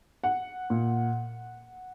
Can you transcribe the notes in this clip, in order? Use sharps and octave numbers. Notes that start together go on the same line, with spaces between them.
F#5
A#2